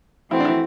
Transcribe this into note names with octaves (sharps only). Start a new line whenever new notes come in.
E3 A3 C4 E4 F#4
D4
E4